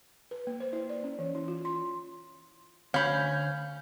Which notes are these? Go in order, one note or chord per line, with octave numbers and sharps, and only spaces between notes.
B4
A#3
C5
E4
D5
C#4
E3
E4
F4
C6
D2 C#4 F5 B5 G6